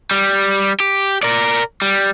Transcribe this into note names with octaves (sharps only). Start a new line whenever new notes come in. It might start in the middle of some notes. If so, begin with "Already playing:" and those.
G3
G4
A#4 D5
G3